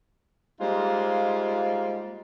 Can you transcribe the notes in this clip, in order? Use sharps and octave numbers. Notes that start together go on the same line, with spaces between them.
G3 G#3 A#3 D#4 F4 C5